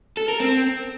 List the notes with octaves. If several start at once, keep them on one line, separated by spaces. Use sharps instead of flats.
A4
A#4
C4